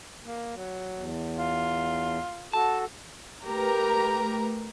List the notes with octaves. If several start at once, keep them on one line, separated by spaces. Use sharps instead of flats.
A#3
F#3
E2
F4
F#4 A4 A5
A3 G4 A#4 B4 A#5